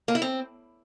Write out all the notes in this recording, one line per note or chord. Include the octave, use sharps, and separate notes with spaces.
A#3
E4
C4